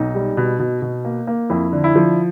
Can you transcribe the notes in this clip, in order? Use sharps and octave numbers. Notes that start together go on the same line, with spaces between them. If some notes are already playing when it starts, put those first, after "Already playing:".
Already playing: B1 D#4
G3
B2
B2
B2
A#3
A#3
F2 E4
D3
E4
F3